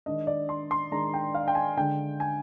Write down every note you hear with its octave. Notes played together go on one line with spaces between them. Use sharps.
D#3 G#3 D4 D#5
D5
C6
C6
D#3 G#3 D4 A#5
G5
F5
G5
G#5
D3 G#3 D4 G5
G#5